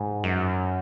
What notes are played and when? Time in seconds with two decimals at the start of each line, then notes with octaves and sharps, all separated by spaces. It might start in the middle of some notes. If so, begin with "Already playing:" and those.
Already playing: G#2
0.24 F#2